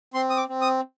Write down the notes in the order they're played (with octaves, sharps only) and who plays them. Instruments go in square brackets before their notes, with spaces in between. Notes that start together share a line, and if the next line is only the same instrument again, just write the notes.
[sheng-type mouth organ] C4 C6
D#6
D6
C4
D#6